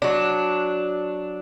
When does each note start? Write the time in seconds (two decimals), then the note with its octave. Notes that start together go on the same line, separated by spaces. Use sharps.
0.02 F#3 D4